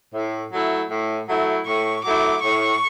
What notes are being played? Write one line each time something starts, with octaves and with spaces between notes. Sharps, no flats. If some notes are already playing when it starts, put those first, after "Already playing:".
A2
F#3 A3 E4
A2
F#3 A3 E4
A2 C#6
F#3 A3 E4 D6
A2 C#6